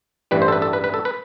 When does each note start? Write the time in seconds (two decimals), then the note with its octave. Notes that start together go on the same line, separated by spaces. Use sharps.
0.31 A1 G2 E3 G3 B4
0.42 C5
0.48 A4
0.52 B4
0.62 A4
0.73 B4
0.84 B4
0.94 A4
1.05 B4